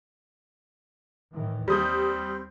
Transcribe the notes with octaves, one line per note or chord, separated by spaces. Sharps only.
A2 D#3 E3
D#2 G3 C4 D#6 G6